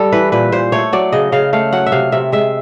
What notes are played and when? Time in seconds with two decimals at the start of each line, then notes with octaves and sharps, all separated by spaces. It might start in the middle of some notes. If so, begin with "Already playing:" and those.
Already playing: G3 A4
0.12 E3 B4
0.32 A#2 B4
0.52 A#2 C5
0.72 A3 C#5
0.93 F#3 D5
1.12 C#3 D#5
1.32 C#3 F5
1.53 A3 F5
1.72 F#3 F#5
1.86 E5
1.92 C3 F5
2.12 C3 E5
2.32 G#3 E5